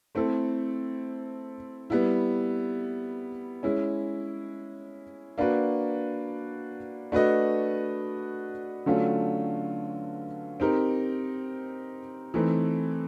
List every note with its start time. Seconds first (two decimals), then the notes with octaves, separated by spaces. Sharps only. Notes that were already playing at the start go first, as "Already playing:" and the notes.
0.15 A3 C4 E4 A4
1.90 G3 B3 E4
3.63 G#3 C#4 E4
5.38 A#3 D4 F#4 B4
7.12 A3 D4 F#4 B4 D#5
8.86 D3 F#3 A3 C#4 F4
10.60 C4 D#4 G4 A#4
12.34 E3 A3 C4 D#4